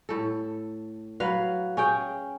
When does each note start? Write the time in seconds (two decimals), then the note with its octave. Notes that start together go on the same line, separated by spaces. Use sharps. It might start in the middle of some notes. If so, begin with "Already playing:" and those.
0.09 A2 A4
1.20 F#3 B4 F5
1.77 C#4 G#4 G5